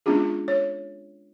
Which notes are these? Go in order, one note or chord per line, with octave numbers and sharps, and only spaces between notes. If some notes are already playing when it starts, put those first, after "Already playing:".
G#3 B3 C#4 D4 F4 G#4
C#5